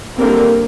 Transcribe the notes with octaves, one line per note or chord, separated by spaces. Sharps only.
D3 G3 A#3 C4 A#4